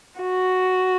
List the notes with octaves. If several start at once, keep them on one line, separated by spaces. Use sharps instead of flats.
F#4